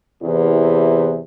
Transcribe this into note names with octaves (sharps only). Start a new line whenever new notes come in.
E2 C3 E3